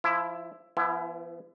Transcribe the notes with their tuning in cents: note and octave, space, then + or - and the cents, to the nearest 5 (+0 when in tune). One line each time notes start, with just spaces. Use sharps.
F3 -15 E4 +10
F3 -40 B3 +0 E4 +20